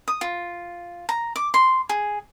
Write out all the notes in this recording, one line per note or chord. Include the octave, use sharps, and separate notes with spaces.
D#6
F4
A#5
D6
C6
G#4